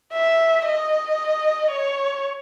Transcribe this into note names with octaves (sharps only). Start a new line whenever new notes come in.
E5
D#5
C#5